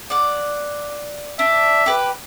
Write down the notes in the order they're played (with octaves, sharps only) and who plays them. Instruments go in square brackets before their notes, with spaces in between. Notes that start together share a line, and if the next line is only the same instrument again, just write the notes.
[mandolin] D5 F#5
[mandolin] D4 [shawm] E5
[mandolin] G4 B4